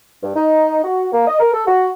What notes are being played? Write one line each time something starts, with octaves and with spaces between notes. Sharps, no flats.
G2
D#4
F#4
A#3
D#5
A#4
A4
F#4